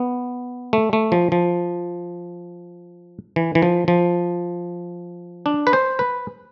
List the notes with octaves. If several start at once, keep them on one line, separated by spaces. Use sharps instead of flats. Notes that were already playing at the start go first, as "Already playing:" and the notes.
Already playing: B3
A3
A3
F3
F3
E3
E3
F3
F3
D4
B4
C5
B4